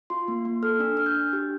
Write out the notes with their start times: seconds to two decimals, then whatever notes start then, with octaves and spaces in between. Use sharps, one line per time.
0.10 F4 C6
0.28 A#3
0.45 A#3
0.63 A4 F6
0.80 D4 E6
0.97 D4 F6
1.06 G6
1.15 D4
1.33 G4